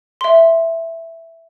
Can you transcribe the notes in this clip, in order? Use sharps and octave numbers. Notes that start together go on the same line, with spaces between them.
E5 C6